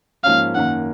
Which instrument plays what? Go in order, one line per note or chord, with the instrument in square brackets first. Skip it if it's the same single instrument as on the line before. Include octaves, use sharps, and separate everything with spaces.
[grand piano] G#2 F3 A#3 C#4 [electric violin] F5
[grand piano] F#2 D#3 A#3 [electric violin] F#5